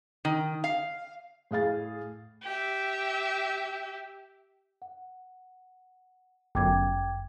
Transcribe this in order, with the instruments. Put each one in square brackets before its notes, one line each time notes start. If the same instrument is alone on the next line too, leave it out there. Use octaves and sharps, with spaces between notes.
[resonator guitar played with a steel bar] D#3
F5
[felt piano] A2 G#4 F5 A6
[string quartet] G4 E5
[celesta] F#5
[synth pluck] G1 F#2 [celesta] G5 D6 G#6